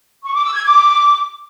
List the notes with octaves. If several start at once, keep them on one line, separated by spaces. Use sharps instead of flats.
C#6
D6
E6
G#6
D6